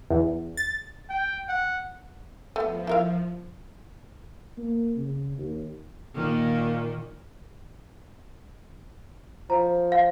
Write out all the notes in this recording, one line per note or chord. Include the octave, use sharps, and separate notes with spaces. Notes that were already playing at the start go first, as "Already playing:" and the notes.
E2
A6
G5
F#5
F3 A3 B3
E4 A#4 F5
A#3
C#3
D#2
A#2 D#3 A#3
F3 A#5
F5